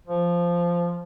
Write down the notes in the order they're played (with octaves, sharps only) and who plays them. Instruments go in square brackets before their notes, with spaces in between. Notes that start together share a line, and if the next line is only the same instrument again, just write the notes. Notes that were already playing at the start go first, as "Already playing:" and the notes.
[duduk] F3